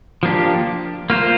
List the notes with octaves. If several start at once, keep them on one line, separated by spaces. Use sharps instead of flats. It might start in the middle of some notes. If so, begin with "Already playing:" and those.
F3 A#3 D4 G4
A#3 F4 C5